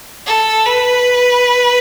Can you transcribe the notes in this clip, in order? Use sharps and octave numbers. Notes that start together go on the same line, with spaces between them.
A4
B4